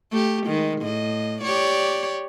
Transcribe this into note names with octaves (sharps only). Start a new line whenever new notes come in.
A3 G4
D#3 G#3
A2 D#5
G4 C#5 D5